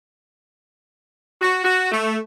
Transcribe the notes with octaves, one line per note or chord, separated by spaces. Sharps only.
F#4
F#4
A3